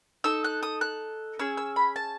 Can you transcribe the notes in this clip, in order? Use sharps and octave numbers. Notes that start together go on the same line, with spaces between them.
D#4 A4 E6
F#6
D#6
F#6
C#4 G#4 E6
E6
B5
A5